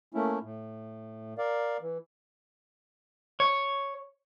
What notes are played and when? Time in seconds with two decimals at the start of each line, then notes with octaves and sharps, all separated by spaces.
0.14 A3 A#3 C#4 E4
0.42 A2
1.38 A#4 D5 F5
1.81 E3
3.40 C#5